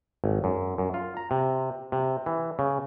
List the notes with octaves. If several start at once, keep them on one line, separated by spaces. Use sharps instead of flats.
G#1
F#2
F#2
F4
A#5
C3
C3
E3
C#3